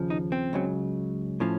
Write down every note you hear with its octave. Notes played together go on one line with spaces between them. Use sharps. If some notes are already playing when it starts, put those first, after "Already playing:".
Already playing: D#2 C#3 F3
D#4
C4
C#2 C#3 F#3
A2 F3 C#4